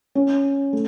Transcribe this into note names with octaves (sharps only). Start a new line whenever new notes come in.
C#4
A3